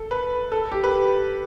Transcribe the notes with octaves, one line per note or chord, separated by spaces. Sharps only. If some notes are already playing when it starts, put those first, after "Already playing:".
Already playing: A4
B4
A4
G4
B4